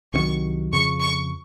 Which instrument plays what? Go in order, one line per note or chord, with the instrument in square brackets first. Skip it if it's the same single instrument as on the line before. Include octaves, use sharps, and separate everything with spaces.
[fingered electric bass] C2 C3 D#3 F#3 [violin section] C#6
[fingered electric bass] F2 C#3 F3 [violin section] C#6
[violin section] C#6